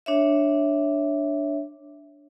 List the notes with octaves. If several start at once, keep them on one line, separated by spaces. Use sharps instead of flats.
D4 C#5 E5